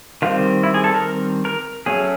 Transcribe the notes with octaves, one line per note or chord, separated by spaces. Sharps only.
D#3 G3 C4 F4
E4
G#4
A4
A#4
A#4
F#3 A3 C#4 G#4